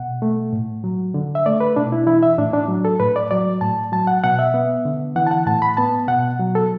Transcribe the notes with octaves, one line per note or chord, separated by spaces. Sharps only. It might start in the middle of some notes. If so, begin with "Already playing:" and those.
Already playing: B2 F#5
A3
A2
F#3
D3
E5
A3 D5
B4
B2 D4
E4
E3 E4
E5
A2 D4
D4
F#3
A4
A2 B4
D5
F#3 D5
A2 A5
F#3 A5
F#5
B2 F#5
E5
B3
D3
E3 F#5
A5
F#5
A2 A5
B5
B3 A5
B2 F#5
F#3
A4